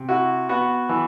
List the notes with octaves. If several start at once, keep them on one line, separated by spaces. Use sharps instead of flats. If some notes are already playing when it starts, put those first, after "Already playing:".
Already playing: C3
E4 F#4
B3 F#4
E3